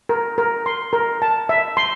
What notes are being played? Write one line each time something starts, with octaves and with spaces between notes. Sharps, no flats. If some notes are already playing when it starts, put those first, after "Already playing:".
A#4
A#4
C6
A#4
A5
E5
C6